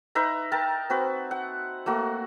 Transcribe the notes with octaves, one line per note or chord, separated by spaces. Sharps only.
D#4 B4 E5 A#5
A#4 G5 A5
C4 F#4 B4
F#5
A3 A#3 F#4